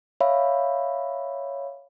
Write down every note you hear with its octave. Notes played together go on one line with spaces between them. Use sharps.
C#5 E5 F5 B5